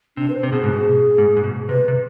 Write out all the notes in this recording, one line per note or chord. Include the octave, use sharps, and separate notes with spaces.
C3 D4
B4
C5
C3
B2 G#4
G#2 G#4
B2
G#2
G#2
B2
C3 B4
C3